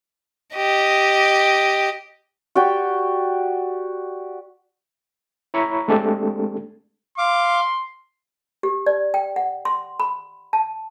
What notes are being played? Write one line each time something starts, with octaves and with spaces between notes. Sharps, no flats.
G4 D#5
F#4 G4 D5 G5
E4 C#5 A#5 B5 C#6
G#3 A3 C4 D4 G4 A4
F5 C6 D6
G4
D5
G5
F#5
C6
B5
A5